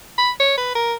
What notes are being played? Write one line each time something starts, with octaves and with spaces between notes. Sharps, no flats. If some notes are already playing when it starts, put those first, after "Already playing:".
B5
C#5
B4
A#4